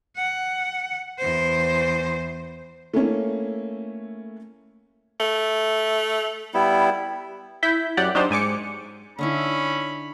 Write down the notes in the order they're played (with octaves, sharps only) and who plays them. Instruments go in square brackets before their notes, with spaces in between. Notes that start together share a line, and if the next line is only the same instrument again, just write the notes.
[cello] F#5
E2 C5
[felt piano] A3 A#3 C#4 E4
[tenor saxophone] A3
[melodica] G3 B3 E4
[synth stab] E4 G6 B6
F#2 G4 D5 F#5
F#3 D4 D#4 G4 C5
G#2 G#5 D6 C#7
[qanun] D3 D#4 E4 [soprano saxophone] C#4 [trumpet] B5